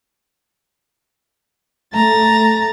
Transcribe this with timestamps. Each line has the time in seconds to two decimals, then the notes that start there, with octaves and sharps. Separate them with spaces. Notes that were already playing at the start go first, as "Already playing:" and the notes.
1.95 A3 A#5 A6